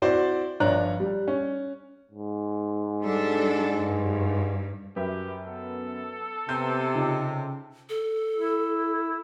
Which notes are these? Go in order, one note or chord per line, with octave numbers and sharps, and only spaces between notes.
C4 E4 F#4 C5 D5
G1 F3 D4 C#5 A#5 F#6
G3
C#4
G#2
G3 D4 A4
G2
F#2 G4 A#4 B4 E5
B3 A4
C3 B3 G6
C#3 D#4 F4 G4
A4
E4